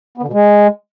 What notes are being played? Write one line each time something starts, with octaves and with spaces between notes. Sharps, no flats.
B3
D3
B2
G#3